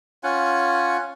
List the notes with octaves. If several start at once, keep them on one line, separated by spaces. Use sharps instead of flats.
C#4 F4 F#5 G#5